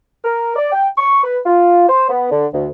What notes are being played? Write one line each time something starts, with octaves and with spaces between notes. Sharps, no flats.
A#4
D5
G5
C#6
B4
F4
C5
B3
D3
D2